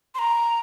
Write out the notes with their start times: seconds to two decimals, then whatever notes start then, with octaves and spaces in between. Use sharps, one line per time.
0.15 C6
0.19 A#5